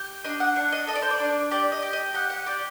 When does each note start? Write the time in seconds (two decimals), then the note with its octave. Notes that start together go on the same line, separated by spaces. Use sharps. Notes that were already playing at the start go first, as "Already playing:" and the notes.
Already playing: G4
0.24 D4 D#5
0.40 F#5
0.56 D4 F#5
0.72 D#5
0.87 A4 D#5
0.95 D5
1.02 C5
1.10 D5
1.20 D4
1.51 G4 D5
1.72 D#5
1.82 G4
1.93 D#5
2.14 G4 F#5
2.30 F#5
2.46 G4 D5